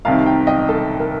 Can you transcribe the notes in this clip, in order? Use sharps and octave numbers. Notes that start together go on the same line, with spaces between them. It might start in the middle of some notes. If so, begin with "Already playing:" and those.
C2 C3 D#3 F5 A5
G5 A#5
D#5 G5
A4
A#4